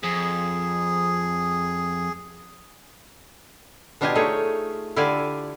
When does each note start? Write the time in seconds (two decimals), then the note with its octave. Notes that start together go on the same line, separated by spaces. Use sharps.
0.03 F2 G#4
4.01 B2 D4 F4 G4 D#5 G#5
4.15 A3 D#4 G#4 C#5
4.96 D3 E4 F4 G4 D5 G#5